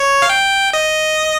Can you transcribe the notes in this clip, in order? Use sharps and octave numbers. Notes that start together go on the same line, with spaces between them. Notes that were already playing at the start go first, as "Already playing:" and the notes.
Already playing: C#5
F5
G5
D#5